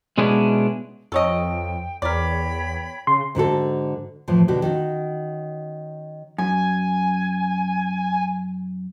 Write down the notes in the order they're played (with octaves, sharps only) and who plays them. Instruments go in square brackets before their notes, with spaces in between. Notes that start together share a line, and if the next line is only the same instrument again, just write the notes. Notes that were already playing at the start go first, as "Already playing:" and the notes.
[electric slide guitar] B2 G#3 B3 C#4 D4 E4
[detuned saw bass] F2 [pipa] A4 C#5 D#5 [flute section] G5
[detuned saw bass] E2 [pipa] A#4 D5 [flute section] C#5 G5 B5
[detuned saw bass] C#3 [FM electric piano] C6
[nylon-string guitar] G#2 D3 F#4 A4
A2 E3 F3
B2 D3 G3 F#4 G4
D#3 C#4 F#4
[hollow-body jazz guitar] F#2 [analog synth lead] G#5